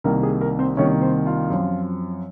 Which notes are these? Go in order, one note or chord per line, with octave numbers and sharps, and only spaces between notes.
C2 C3 D#3 A#3 A#4
G#4
A#4
C4 C5
C2 C3 D#3 A#3 C#4 C#5
C4 C5
F4 F5
F#2 F3 C4